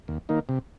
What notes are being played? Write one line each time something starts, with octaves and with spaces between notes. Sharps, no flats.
D#2
D#3 A#3 D#4
C3